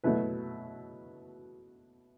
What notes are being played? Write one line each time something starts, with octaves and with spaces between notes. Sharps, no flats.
B2 F#3 A3 E4 B4